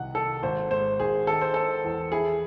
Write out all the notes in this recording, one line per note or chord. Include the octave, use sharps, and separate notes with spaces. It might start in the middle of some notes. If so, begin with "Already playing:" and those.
Already playing: C2 D#3 F#5
D#3 A4
G#1 C5
G#2 C5
G#1 G#4
D#3 A4
C5
D#3 A4
E2
E4 G#4